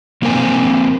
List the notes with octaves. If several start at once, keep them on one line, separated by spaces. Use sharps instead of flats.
F3 A#3 C4 A#4 G#5